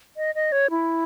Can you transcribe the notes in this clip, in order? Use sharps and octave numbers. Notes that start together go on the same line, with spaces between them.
D#5
D#5
C#5
E4